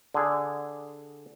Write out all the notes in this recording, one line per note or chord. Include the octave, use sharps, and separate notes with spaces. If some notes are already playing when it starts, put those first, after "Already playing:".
D3 G#4